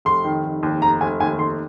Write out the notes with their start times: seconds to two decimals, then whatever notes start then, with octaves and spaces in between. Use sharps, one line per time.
0.05 F1 C6
0.24 D#3
0.44 F1
0.63 D#2
0.82 F1 A#5
1.01 F1 G#5
1.20 D#2 G#5
1.39 F1 C6